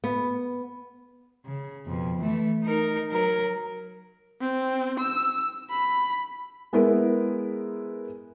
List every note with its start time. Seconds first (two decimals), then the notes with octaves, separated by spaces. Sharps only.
0.04 B3
1.46 C#3
1.86 F2 B2
2.18 E3 A3
2.63 D#4 A#4
3.11 F#3 A#4
4.40 C4
5.00 E6
5.70 B5
6.73 G#3 B3 E4 A#4 B4